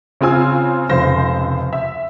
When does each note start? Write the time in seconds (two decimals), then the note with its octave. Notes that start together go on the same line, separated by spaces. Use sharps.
0.21 C#3 C4 F4 G#5 E6
0.89 F1 C#2 C5 A#6
1.73 E5